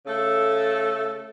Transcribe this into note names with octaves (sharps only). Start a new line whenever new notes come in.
C#3 A3 A4